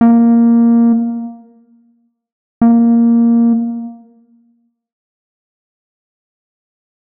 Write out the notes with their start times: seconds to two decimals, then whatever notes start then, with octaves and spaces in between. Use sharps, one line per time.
0.01 A#3
2.61 A#3